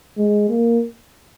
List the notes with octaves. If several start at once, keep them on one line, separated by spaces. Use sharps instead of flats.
G#3
A#3